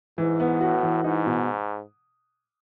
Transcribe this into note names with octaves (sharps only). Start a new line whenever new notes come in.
G#2 E3
B3
A2 F#4
E3
G#2 D#4
B2